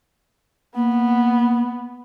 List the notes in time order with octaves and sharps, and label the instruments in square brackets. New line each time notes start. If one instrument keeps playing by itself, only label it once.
[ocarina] A#3 [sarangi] B3